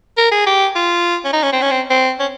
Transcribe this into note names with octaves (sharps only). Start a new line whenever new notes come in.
A#4
G#4
G4
F4
C#4
D#4
C#4
C4
C#4
C4
C4
C#4